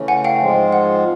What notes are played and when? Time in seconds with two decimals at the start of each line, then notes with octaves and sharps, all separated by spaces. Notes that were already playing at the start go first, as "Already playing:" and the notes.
Already playing: C#3 E3 A3 C#4
0.08 F#5 G#5
0.25 F5 G5
0.40 G#2 F3 G#3 C4 F4
0.73 F#5